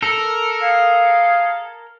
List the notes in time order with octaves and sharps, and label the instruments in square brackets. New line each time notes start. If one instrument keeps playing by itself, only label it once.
[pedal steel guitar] A4 [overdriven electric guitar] A#4
[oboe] G#4 [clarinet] F5